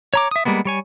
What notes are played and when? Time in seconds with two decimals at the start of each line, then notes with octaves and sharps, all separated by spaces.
0.14 C#5 A#5 D6
0.31 E5 D#6
0.45 G3 G#3 A#3 B3
0.65 G3 C#5 G#5